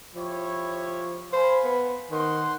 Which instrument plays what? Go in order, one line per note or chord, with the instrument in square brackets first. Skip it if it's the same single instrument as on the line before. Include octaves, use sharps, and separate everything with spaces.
[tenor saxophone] F3 [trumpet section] E4 G4 C#5
[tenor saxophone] C5 [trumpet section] F5 G#5 B5
[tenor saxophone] B3
[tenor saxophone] D#3 [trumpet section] C5 F#5 C6